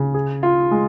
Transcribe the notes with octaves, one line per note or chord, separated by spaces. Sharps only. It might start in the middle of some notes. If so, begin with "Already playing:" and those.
Already playing: C#3
G#4
F4
G#3